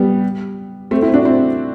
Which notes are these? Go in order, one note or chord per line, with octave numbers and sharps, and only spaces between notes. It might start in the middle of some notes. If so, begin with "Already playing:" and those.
Already playing: G3 B3
A3 C4
C4 E4
D4 F#4
C4 E4